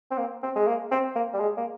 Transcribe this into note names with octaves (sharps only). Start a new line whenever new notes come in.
C4
A#3
C4
G#3
A#3
C4
A#3
G3
G#3
A#3